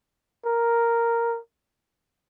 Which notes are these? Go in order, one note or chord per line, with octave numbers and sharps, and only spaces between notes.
A#4